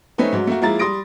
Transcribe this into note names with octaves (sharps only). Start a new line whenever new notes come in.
A3 C4 C#4 D#4 B4
G#2 F#3
A3 A#3 F#4
F3 G#3 A#3 E4 A#5 A6
G3 C6 D#6 A#6 D7